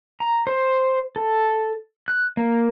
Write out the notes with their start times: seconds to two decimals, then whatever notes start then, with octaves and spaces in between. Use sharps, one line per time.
0.20 A#5
0.47 C5
1.16 A4
2.08 F#6
2.37 A#3